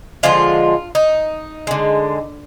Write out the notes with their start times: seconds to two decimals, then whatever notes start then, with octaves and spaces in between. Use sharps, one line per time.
0.23 D3 F3 G#3 F4
0.95 D#4
1.67 D3 G#3